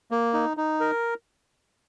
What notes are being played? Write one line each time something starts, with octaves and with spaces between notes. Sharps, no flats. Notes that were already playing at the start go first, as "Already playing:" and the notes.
A#3
D#4
D#4
A#4